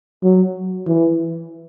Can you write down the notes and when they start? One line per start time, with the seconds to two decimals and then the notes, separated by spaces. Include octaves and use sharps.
0.23 F#3
0.87 E3